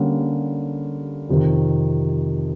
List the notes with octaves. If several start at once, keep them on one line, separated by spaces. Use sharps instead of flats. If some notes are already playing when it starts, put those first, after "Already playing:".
Already playing: D3 G3 A#3 C#4
F2 C3 D#3